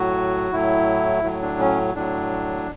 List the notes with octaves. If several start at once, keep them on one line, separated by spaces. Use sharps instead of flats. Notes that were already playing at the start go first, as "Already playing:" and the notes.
Already playing: A2 F#3 F#4
A2 F#3 E4
A2 F#3
D4
C#4
A2 F#3 D4